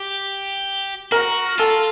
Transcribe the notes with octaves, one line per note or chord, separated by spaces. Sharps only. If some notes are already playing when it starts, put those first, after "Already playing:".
Already playing: G4
F#4 A#4
F4 A4